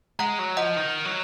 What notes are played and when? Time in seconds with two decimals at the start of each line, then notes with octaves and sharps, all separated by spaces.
0.19 G#3 F#5 A#5
0.39 F#3
0.57 F3 D#5 F#5
0.76 D#3
1.05 F#3